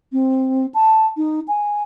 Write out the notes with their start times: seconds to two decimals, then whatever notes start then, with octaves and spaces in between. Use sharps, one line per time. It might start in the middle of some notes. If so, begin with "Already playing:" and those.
0.13 C4
0.74 A5
1.17 D#4
1.48 G#5